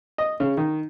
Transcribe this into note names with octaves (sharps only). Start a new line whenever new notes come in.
D#5
C#3
D#3